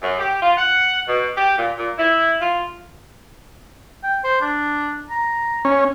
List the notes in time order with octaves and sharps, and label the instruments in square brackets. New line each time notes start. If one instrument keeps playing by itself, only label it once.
[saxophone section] F#2
G4
F4
F#5
B2
G4
A#2
A#2
E4
F4
[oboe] G5
C5
D4
A#5
[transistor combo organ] C#4